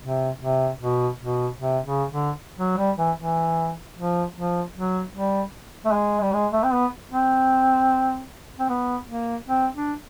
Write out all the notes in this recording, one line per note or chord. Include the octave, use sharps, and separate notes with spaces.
C3
C3
B2
B2
C3
C#3
D3
F#3
G3
E3
E3
F3
F3
F#3
G3
A3
G#3
G3
G#3
A3
C4
B3
C4
C4
B3
A#3
C4
D4